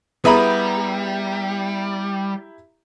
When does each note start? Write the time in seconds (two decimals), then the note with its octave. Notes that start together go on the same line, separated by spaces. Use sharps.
0.25 G3 B3 E4 G4 G#4 E5 A#5 B5